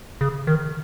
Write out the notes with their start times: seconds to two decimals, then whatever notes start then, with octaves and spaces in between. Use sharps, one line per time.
0.21 C#3
0.47 D#3